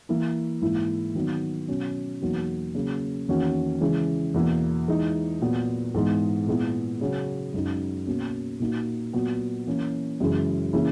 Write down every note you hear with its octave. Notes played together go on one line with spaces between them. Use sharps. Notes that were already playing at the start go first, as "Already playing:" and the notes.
E3 A#3 E4
G#2 E3 A#3 E4
D#3 F#3 B3 D#4
B2 F#3 C#4
E2 B2 F#3 A#3 D#4
C#3 F#3 A#3
E2 D#3 A#3 C#4 F#4
C#3 E3 G#3
E2 B2 A#3 E4
E3 G#3 D#4
A#2 F#3 B3
G#2 E3 G#3 B3 D#4
A#2 G#3 B3 E4
C#3 F#3 C#4 F#4
F#2 C#3 G#3 D#4 F#4
B2 A#3 C#4
A#2 A#3 D#4 F#4
A#2 F#3 B3 F#4
E3 A#3 C#4
F#2 C#3 E3 G#3
C#3 E3 A#3 E4